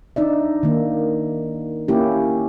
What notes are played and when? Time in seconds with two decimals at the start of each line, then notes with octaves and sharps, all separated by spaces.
0.16 D4 D#4 D5 E5
0.63 D#3 A#3
1.88 A#3 C#4 E4 G4